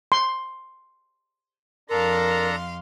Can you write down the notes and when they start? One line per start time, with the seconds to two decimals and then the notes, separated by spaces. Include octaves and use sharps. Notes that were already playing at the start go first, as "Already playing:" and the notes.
0.12 C6
1.89 F2 D4 A4 A#4 F5 A#5 C6